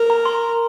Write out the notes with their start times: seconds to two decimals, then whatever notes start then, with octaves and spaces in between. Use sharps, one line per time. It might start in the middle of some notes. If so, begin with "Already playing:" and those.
Already playing: A#4
0.10 A#5
0.26 C6